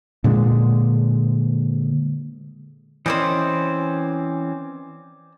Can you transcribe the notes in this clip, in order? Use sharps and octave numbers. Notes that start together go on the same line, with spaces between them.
A#2 D3 G#3
E3 C4 C#4 C5 D5 D#5